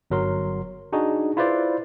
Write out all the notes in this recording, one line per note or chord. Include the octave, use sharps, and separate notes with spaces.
G1 F#3 A#4 C6
D4 D#4 F#4 G#4
E4 F4 B4 C5 D5